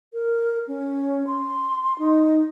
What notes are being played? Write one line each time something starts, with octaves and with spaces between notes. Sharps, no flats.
A#4
C#4
C6
D#4